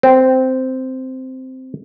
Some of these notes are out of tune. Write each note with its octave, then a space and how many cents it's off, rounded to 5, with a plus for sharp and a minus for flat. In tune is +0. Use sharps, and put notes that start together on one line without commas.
C4 -10